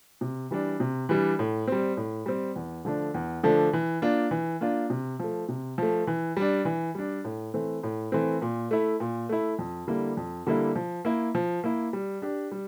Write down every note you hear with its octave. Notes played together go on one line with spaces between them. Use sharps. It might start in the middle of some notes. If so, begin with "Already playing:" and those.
C3
E3 G3 D4
C3
E3 G3 D4
A2
G3 C4
A2
G3 C4
E2
D3 F3 A3 D4
E2
D3 F3 A3 D4
E3
A#3 D4 F4
E3
A#3 D4 F4
C3
F3 A3
C3
F3 A3
E3
G3 D4
E3
G3 D4
A2
E3 A3 C4
A2
E3 A3 C4
A#2
A3 E4
A#2
A3 E4
F2
D3 G3 A#3 E4
F2
D3 G3 A#3 E4
F3
A#3 E4
F3
A#3 E4
G3
D4 G4
G3